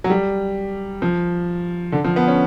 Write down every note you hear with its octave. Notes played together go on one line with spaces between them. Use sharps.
F#3
G3
F3
D3
F3
B3
C#4